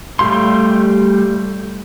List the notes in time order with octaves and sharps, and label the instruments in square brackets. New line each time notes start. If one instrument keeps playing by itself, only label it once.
[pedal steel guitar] G3 A3 G4 F5 C6